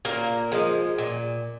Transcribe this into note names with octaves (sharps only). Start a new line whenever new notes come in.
A#2 A#3 A#4
F3 G#3
A#2